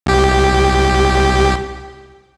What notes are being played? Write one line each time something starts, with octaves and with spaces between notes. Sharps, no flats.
C2 G4